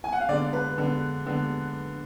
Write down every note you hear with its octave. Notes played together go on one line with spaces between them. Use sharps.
G#5
F#5
F5
D3 G#3 B3 D5
B4
D3 G#3 B3
D3 G#3 B3